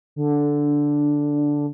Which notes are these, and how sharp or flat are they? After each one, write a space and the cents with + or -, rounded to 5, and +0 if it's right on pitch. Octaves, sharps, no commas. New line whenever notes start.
D3 -5